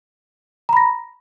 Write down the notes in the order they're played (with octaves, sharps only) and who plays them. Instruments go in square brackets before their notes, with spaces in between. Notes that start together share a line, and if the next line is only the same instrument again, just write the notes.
[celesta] A#5
B5
A#6